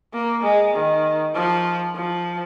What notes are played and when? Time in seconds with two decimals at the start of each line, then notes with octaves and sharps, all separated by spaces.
0.13 A#3
0.43 G#3
0.74 D#3
1.35 F3
1.95 F3